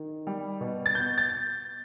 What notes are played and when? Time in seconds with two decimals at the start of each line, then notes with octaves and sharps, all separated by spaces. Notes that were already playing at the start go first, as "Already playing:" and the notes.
Already playing: D#3
0.27 G3
0.61 B2
0.86 A6
0.95 B3 G6
1.18 A6